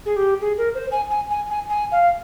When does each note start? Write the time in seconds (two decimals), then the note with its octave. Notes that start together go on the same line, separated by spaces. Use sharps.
0.06 G#4
0.16 G4
0.41 G#4
0.58 A#4
0.75 C5
0.92 G#5
1.10 G#5
1.31 G#5
1.50 G#5
1.69 G#5
1.92 F5